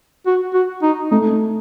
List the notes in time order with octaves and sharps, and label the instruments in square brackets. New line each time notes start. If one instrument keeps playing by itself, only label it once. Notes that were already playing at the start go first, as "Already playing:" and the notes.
[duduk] F#4
F#4
D#4
[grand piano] A3 [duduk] D#4